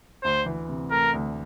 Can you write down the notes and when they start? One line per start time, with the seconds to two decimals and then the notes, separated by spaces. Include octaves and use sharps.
0.23 D2 C5
0.46 E3
0.69 C3
0.91 A3 A#4
1.14 D2